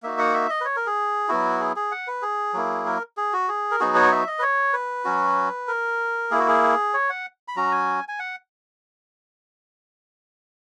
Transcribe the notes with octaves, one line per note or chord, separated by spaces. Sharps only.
A#3 D#4 F#4 E5
F#5
E5
D#5
B4
C#5
A#4
G#4
F#3 B3 E4 F#4
G#4
G#4
F#5
B4
G#4
F#3 A#3 E4
A#4
G#4
F#4
G#4
A#4
F#3 B3 D#4 F#4 G#4
C#5
E5
D#5
B4
C#5
B4
F#3 C#4 F#4
A#4
A#3 E4 G#4
F#4
G#4
C#5
F#5
B5
F#3 C#4 F#4 A#5
G#5
G#5
F#5